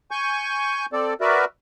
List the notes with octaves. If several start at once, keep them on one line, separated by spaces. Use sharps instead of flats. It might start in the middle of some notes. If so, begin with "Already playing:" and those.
G#5 C#6 G6
C4 A4 D5
F#4 A#4 B4 D5 E5